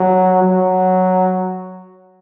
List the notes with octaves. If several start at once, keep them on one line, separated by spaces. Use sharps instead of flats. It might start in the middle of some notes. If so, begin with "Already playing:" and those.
Already playing: F#3
F#3